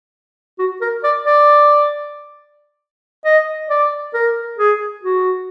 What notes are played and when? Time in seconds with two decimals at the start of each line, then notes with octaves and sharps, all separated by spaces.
0.59 F#4
0.81 A#4
1.04 D5
1.25 D5
3.25 D#5
3.70 D5
4.14 A#4
4.58 G#4
5.03 F#4